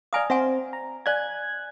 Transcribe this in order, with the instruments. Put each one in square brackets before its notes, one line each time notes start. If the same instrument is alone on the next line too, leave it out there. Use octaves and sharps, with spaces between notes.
[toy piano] D5 G#5 D#6 [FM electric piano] F5 A#5 F6
[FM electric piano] C4 C5 [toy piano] E5 F#5 G#5
[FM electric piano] A#5
[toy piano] D5 F5 [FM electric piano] G#5 F#6 G#6